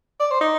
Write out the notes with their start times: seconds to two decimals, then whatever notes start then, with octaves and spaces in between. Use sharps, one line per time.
0.20 D5
0.31 C5
0.41 D#4